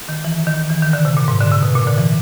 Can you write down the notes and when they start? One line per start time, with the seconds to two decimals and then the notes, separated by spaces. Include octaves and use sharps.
0.09 D#3
0.24 E3
0.47 D#3
0.70 E3
0.82 D#3
0.93 D3
1.05 C3
1.17 A#2
1.28 G#2
1.40 D3
1.52 C3
1.63 B2
1.75 A#2
1.87 D3
1.98 E3